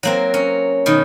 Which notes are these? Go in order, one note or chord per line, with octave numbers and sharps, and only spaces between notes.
F#3 A#3 C4
C#4
B2 D#3